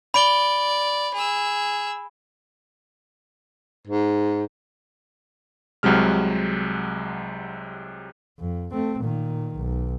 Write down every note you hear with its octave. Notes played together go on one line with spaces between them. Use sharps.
D5 B5 D7 G7
G#4 E6
G#2
C2 C3 F#3 G#3 F6
F2
A3 C4
A#2 D#3
B1